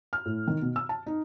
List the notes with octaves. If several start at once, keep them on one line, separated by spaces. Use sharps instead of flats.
F6
A2
D#3
B2
E6
A5
D#4